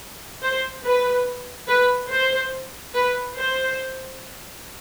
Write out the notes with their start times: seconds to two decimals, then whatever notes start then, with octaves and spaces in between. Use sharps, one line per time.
0.42 C5
0.84 B4
1.67 B4
2.10 C5
2.95 B4
3.36 C5